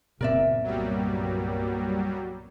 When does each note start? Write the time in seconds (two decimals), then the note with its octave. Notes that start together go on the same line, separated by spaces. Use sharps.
0.21 F#1 A#2 B3 C4 A#4 D5 E5
0.64 C2 G2 F#3 G3 A#3